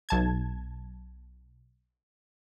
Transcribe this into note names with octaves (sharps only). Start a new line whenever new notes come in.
B1 A5 G#6